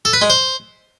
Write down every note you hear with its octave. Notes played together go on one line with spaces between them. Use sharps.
A4
B4
G#3
C5